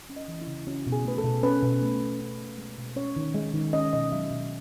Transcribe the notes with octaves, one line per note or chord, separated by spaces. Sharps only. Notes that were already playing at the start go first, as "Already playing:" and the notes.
C#4
D#5
E3
E4
C#3
C#4 F#4
B2
G#4
A3 B4
A4
B2
C#4 B4
B2
A3
B2
C#4
B2
G#3
B2
C#4 C#5
D#3
G#3
D#3
C#4 D#5
B2 D#5
F#3 E5
B2 E5